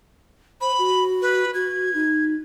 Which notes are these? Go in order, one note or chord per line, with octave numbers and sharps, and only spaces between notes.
C5 B5
F#4
B4
F#4 G#6
D#4